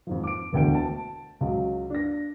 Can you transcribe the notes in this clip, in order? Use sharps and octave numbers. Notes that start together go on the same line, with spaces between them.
F2 G#2 F3
D6 D7
E1 D2 G5 D7
A5
C#2 F#3
D4 A#6